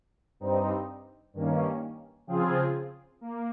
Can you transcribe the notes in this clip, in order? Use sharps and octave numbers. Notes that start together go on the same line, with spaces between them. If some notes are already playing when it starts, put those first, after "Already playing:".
G2 G3 C4 D#4
G2 D#3 A#3 C#4
C#3 F3 C4 F4 G#4
A#3